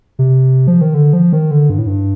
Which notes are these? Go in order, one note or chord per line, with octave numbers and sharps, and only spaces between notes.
C3
F3
D#3
D3
F3
D#3
D3
G2
A2
G2